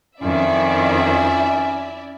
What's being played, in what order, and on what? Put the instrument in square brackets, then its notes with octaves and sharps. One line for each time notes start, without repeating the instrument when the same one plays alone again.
[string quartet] F2 D#3 [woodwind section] C#4 [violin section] E4 D5 E5